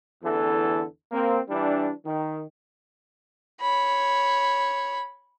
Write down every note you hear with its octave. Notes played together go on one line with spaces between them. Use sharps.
A1 E2 D3 E3 A4
A#3 C4
E3 G3 D4
D#3
C#5 B5